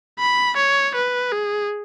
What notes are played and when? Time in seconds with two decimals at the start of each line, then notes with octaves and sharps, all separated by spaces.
0.19 B5
0.57 C#5
0.95 B4
1.32 G#4